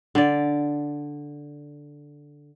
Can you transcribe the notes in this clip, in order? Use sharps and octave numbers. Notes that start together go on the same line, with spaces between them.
D3 D5